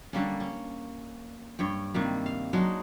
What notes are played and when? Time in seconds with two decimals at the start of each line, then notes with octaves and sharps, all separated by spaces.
0.13 D3 G3 A#3 C#4
0.40 C#4
1.59 G2 C#5 G5
1.94 C3 D#3 G3 A#3
2.26 F5
2.53 F#3 G#3 D4 D#4